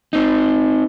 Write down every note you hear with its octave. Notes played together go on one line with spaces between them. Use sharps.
C4 D#4